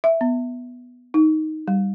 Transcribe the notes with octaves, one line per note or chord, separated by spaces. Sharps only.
E5
B3
D#4
G3